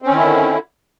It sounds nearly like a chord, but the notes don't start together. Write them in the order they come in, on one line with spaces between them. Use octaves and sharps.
C4 C#4 D#3 E4 D3